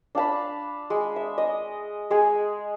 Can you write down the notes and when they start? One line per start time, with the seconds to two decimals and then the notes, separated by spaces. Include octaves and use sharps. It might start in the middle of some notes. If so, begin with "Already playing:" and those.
0.15 D4 F5 A5 B5
0.90 G#3
1.16 E5
1.38 D#5
2.11 G#3 G#4 G#5